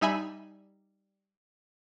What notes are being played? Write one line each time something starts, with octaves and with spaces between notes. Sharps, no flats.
G3 D#4 E5 G#5 B5